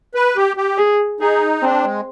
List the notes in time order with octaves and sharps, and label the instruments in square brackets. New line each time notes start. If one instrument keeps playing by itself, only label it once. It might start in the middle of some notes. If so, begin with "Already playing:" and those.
[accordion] B4
G4
G4
[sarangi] G#4
[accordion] D#4 [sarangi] G#4
[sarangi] C4 [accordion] D4
[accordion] G#3